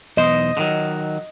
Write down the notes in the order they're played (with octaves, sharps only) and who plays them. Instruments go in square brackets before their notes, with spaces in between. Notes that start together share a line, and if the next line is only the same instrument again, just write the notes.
[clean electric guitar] B1 E2 C5 [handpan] D#5
[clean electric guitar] D3 D#3 F#3